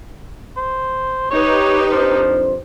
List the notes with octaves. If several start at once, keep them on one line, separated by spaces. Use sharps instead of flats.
C5
D#4 G4 B4 C#5
F2 F3 D4 C5